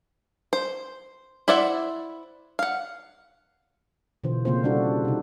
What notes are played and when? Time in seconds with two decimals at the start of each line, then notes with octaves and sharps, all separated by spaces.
0.53 C5
1.48 E4 C5 D5 E5 F#5
2.59 F5 F#5
4.24 B2 D3 E3 F4 C5
4.45 C#3 A#3 C4 F4 C5
4.64 G3 D4 E4 F#4 A4
5.05 C3 D#4